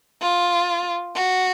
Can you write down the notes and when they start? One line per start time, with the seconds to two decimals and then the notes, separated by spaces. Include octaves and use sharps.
0.22 F4
1.15 F#4